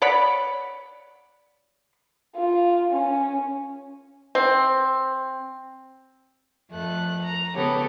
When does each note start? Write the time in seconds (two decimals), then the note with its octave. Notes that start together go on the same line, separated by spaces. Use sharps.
0.02 C#5 D5 F#5 B5
2.36 F4
2.91 C#4
4.35 C4
6.70 F2 A3 F#6
7.22 A#5
7.55 C#3 B3 G4 A4 C#5